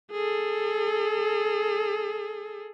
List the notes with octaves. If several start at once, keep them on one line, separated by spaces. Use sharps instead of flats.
G#4 A4